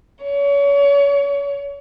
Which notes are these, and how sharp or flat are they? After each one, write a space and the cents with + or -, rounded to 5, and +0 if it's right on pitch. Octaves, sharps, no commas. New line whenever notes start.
C#5 +30